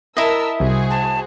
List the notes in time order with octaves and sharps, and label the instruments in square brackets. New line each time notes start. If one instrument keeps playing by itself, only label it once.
[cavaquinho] E4 D#5 [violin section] A#4 A5 E6 [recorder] E5
[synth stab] C2 [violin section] F#4 G#4 C5
[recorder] A5